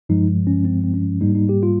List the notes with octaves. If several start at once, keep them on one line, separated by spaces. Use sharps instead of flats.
G2 F3 G#3 D#4
C#4
C4
C4
C#4
G#2 G3 A#3 D#4
D#4
G4
F4